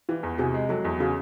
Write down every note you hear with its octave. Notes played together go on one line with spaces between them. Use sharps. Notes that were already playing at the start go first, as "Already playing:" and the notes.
E3 F4 G4
E2
C3 F#4 G#4
G#3
F#3 G4 A4
E2
C#3 F#4 G#4